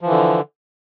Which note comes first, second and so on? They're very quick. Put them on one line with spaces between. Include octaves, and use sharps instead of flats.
F3 E3 D3